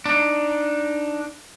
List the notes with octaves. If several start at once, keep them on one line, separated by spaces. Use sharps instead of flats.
D4 D#4